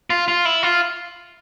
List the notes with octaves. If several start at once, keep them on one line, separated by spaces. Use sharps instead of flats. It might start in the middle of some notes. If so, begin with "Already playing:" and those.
F4
F4
E4
F4